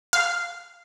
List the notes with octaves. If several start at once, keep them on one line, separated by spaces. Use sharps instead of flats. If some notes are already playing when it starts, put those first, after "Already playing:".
F5